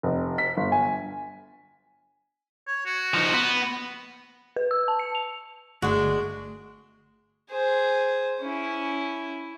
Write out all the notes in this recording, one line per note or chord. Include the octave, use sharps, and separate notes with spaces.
F1
B6
G1
G#5
C#5
F#4
F3 D#4
B3
B4
E6
A5
C#7
F7
G1 G#3 A3 D4 F#4
G#4 C5
C#4 E4